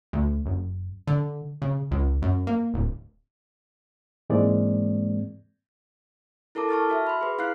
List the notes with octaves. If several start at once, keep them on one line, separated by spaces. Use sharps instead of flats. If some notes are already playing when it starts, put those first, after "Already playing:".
D2
F#1
D3
C#3
C#2
F#2
A#3
D1
G#2 E3 G#3 A#3 C4 D5
E4 A4 A#4 A5 D6
A5 C#6 F6 A6
F#4 E5 F6
B5 C6
G#4 B4
E4 F5 F6 F#6 C7